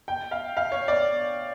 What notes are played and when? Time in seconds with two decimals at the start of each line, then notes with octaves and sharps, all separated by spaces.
0.08 G5
0.31 F5
0.57 F5
0.72 C#5
0.88 D5